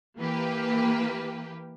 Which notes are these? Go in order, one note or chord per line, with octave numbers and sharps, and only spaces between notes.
E3 A#3 G4 B4